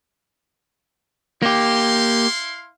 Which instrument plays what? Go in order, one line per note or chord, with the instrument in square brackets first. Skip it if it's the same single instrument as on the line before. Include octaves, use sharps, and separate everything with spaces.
[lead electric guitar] A#3 G4 [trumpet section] E4 F5 C6